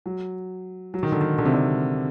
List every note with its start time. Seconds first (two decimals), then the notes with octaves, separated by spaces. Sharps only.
0.06 F#3
0.94 F#3
1.03 D#3
1.12 D3
1.21 D#3
1.38 D3
1.45 C3
1.53 D3